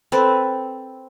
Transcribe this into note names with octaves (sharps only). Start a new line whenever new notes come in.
C4 A4 B4